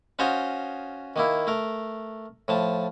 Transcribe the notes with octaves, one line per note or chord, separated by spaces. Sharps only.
C#4 F4 F#4 C5 C#5 D#5
D#3 A#3 E4
A3 A#4
A2 F3 A5